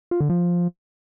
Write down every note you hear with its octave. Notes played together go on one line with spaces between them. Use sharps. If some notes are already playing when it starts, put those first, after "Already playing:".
F4
D3
F3